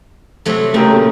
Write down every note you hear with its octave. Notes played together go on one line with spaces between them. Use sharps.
C3 F#3 A3
C#3 A3 G4 A#4
A#2